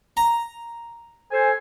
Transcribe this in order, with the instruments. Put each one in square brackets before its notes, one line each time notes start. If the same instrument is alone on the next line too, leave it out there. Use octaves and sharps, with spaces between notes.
[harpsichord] A#5
[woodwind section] A4 C5 G#5